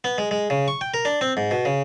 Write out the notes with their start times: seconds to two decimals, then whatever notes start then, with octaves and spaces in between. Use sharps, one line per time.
0.04 B3
0.18 G#3
0.31 G#3
0.50 C#3
0.68 C#6
0.81 G5
0.94 A#4
1.05 D4
1.21 C4
1.37 G#2
1.51 B2
1.65 C#3